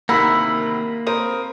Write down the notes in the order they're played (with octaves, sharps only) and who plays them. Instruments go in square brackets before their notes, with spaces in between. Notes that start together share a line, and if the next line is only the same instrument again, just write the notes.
[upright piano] D2 C3 D#3 [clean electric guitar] A#3 [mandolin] E4 F#5 A#5 [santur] B5
[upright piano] C4 A#4 C5 [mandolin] D#6